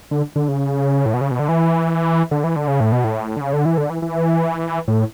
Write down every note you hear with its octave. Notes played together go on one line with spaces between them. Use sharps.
D3
D3
C#3
A2
B2
C#3
B2
D3
E3
D3
E3
D3
C#3
A2
B2
A2
D3
C#3
D3
E3
D3
E3
E3
A2